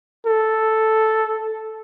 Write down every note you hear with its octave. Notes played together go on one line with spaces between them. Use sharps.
A4